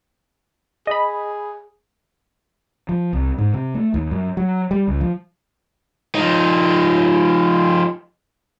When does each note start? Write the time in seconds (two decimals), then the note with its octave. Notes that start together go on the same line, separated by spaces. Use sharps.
0.87 G#4 D#5 B5
2.89 F3
3.13 C2
3.38 G#2
3.54 C3
3.74 A3
3.94 D#2
4.11 F#2
4.37 F#3
4.71 G3
4.88 C#2
5.01 F3
6.15 F3 D#4